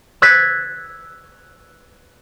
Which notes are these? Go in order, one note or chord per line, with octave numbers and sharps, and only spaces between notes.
E6 F#6 G#6 A6 B6 C#7